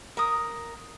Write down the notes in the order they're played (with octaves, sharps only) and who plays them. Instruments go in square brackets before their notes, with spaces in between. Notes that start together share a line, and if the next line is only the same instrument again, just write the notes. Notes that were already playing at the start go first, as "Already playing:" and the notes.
[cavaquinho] A#4 D#6